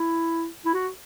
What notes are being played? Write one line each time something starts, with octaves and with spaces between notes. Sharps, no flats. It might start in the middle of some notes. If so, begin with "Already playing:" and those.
Already playing: E4
E4
F#4